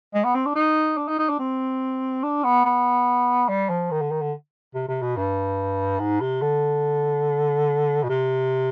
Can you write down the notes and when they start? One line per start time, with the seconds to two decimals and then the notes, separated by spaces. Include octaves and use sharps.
0.14 G#3
0.24 B3
0.35 C4
0.46 D4
0.55 D#4
0.98 D4
1.08 D#4
1.19 D#4
1.29 D4
1.39 C4
2.23 D4
2.44 B3
2.65 B3
3.49 G3
3.69 F3
3.91 D#3
4.01 D3
4.11 D#3
4.22 D3
4.75 C3
4.89 C3
5.02 B2
5.17 G2
6.00 G#2
6.21 C3
6.42 D3
8.04 B2
8.09 C3